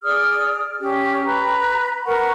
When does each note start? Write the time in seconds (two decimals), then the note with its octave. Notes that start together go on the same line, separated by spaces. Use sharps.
0.04 G#4 D5 D#6 F6
0.79 C#4 G4
1.25 B4 A#5
2.06 A#4 B4 F#5 C#6